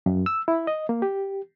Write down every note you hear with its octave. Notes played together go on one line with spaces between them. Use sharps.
F#2
E6
E4
D#5
A#3
G4